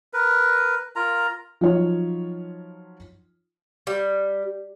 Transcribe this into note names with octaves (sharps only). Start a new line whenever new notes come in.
A#4 B4
F4 A#4 A#5
F3 F#3 D#4 F4 C#5
G3